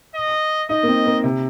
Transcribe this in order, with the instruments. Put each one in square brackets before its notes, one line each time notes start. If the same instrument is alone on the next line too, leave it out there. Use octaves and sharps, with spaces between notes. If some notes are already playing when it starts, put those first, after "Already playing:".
[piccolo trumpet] D#5
[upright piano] D#4 [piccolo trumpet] D#5
[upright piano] A#3
C4
A#3
C3